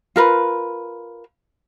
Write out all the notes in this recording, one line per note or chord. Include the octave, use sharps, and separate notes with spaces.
F4 A#4 B4